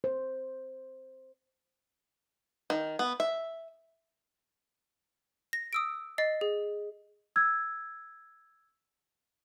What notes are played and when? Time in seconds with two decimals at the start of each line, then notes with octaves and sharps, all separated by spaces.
0.04 C5
2.70 D#3
2.99 B3
3.20 E5
5.53 A#6
5.73 D#6 E6 D7
6.18 D#5 A6 C7
6.41 G#4
7.36 E6 G#6